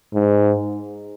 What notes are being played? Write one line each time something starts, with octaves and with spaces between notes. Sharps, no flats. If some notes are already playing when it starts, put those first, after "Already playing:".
G#2